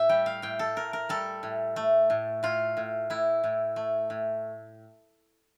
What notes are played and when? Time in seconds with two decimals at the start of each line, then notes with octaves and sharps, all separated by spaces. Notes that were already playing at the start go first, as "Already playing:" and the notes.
Already playing: A2 E5
0.09 G3 G5
0.26 F5
0.42 A2 G5
0.59 A4
0.76 A2 A#4
0.93 A#4
1.09 G3 A4
1.43 A2
1.76 A3
2.10 A2
2.43 A2 F4
2.77 A2
3.10 A2 E4
3.44 A2
3.76 A3
4.10 A2